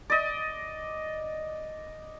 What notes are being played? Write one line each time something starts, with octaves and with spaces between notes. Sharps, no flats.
D5 D#5